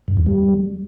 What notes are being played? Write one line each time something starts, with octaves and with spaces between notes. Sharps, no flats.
G2
E2
G3